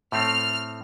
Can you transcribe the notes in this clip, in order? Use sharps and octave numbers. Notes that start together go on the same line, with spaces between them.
A2 A3 C4 F6